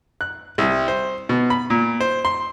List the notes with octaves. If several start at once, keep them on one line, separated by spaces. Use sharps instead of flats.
F#6
C2
C5
B2
B5
A#2
C5
C6